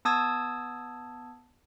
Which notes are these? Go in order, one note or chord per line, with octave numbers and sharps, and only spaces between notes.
B3 A5 D#6 E6 G#6